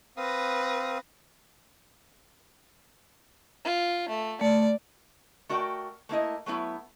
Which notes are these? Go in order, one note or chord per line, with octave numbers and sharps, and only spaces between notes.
C4 B4 F5 D#6 A#6
F4
A3
A3 D5
A3 F#4 A#4 D5 F#5 G5
A3 A#3 E4 D#5
F#3 A3 B3 E4